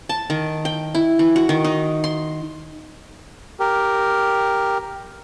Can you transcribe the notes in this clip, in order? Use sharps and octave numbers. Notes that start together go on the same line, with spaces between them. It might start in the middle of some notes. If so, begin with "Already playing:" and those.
A5
D#3
G5
E4
E3
F#4
D#3
D#4
C6
G4 A#4